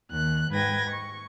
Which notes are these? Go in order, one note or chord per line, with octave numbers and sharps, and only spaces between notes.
D#2 F#6
G#2 B4 G5 G#6 A#6
C#6